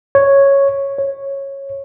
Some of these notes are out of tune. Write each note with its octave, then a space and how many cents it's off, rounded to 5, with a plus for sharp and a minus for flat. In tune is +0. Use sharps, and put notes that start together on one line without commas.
C#5 +0
C#5 -10